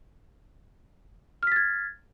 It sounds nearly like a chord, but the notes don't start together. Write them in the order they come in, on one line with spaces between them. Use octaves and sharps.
F6 B6 A6 G#6